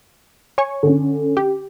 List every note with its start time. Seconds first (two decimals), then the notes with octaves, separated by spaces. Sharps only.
0.58 C#5 G#5 C#6
0.83 D3 C#4
1.37 G4